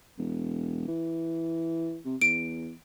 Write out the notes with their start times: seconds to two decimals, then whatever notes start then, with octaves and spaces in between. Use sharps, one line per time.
0.18 E1
0.88 E3
2.05 C3
2.22 E2 D7